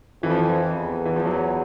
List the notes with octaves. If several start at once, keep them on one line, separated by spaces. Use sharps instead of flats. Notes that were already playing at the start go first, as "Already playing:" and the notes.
F2 E3
F3
E3
E2
E3
F3
F#3